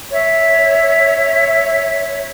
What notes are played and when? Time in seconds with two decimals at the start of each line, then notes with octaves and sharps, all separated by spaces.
0.11 C#5 E5